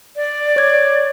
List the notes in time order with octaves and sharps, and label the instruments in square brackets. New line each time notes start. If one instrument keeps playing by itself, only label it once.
[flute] D5
[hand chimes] C#5 G#6